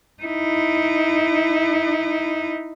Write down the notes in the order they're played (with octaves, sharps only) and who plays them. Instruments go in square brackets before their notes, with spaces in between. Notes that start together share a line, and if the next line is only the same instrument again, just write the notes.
[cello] D#4 E4